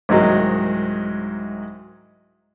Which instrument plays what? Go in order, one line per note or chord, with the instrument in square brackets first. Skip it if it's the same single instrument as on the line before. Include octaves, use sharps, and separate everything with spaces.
[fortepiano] C2 G#2 D#3 F#3 G#3 A#3